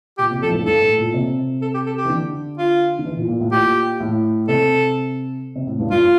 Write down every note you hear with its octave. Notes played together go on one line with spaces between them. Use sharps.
A#2 G4
C3
F2 A4
A2
G2
G2 A4
A2
A#2
C3
A4
G4
A4
G4
E3
D3
F4
D3
E3
A#2
A#2
A2
A#2 G4
A2
C3 A4
C3
A2
G2
G2 F4